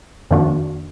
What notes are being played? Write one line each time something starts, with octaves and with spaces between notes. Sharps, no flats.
F2 D#3 A#3 D4 F#4